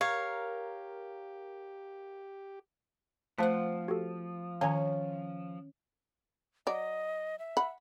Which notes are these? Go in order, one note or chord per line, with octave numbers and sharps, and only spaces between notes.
G4 A#4 C#5 F5
F3 A3 C4 C5 F5 F#5 A5 B6
F#4 G4 A4
D#3 C#4 C#5 F5 G#5 A#5
F#3 D5 D#5
E5
F#5 B5